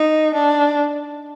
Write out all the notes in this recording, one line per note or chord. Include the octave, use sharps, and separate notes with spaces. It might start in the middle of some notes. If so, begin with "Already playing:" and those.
Already playing: D#4
D4